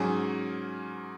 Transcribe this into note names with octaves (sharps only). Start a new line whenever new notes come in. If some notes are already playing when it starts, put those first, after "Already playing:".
Already playing: G#2 F#3 C#4 G#4